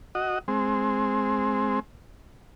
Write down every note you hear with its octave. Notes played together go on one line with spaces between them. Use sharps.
F#4 D#5
G#3 C4